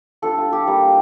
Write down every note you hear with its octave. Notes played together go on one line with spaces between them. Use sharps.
G3 D4 F4 A4
F4
G4
G3 A#3 F4